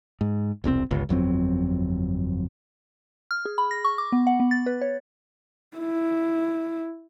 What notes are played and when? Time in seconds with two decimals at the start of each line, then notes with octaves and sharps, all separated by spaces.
0.21 G#2
0.64 E1 C2 B2 C4
0.91 G1 C#2
1.09 G1 F2 F#3 C4
3.31 F6
3.45 G#4
3.58 B5
3.71 A#6
3.85 C#6
3.98 D6
4.12 B3
4.27 F#5
4.40 B3
4.51 A6
4.66 B4
4.81 C#5
5.77 E4